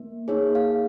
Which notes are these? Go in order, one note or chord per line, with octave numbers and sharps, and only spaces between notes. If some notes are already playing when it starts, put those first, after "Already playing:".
Already playing: A#3
A#3 D#4 G#4 C#5
F5